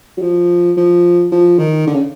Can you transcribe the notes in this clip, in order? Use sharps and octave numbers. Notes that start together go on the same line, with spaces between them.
F#3
F3
F3
F3
D#3
D3
C#3